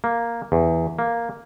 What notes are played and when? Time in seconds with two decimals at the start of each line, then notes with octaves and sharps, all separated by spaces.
0.04 A#3
0.52 E2
0.99 A#3